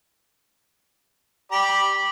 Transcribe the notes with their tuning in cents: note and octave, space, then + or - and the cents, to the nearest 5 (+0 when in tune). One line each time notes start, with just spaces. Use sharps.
G4 +0 D5 +0 B5 -15